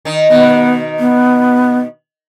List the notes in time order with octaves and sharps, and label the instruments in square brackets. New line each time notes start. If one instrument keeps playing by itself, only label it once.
[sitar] D#3 D#4
[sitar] B2 D#3 [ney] B3
[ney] B3